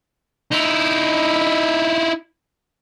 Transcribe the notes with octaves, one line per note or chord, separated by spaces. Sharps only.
D#4 E4